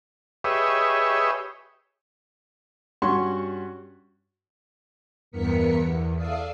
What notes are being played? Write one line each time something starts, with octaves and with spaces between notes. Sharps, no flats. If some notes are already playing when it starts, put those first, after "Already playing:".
G4 G#4 B4 C#5 D#5 E5
G2 C#4 F#4 C6 C#6
E2 G2 B3 A#4 B6 C#7
E2
A4 D5 E5 F5 D#6 C7